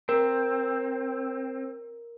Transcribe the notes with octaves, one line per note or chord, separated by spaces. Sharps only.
C4 A#4